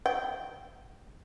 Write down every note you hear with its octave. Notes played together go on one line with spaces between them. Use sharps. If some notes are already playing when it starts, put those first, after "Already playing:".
G5